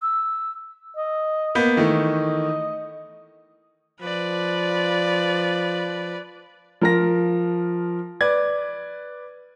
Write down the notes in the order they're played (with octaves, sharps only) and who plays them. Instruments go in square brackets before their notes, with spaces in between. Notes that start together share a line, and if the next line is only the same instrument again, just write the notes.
[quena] E6
[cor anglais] D#5
[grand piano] A#3 B3 G6
[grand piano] D#3 E3 A3 [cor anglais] D#5
[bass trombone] F3 [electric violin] B4 D5
[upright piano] F3 A#4 A#6
B4 D5 G#6